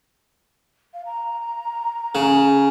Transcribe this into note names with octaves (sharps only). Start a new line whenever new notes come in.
F5
A#5
C#3